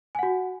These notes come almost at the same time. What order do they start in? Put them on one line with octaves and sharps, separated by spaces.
G#5 F#5 F#4